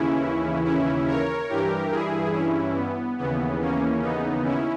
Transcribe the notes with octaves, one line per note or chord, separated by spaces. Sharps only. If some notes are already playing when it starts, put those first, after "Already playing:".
Already playing: D#2 C#3 E3 C#4 E4
C#4 E4
A#4 C#5
G2 E3 G4 A#4
E4 G#4
C#4 E4
B3
D#2 C#3 E3 B3
A#3 C#4
B3 D#4
C#4 E4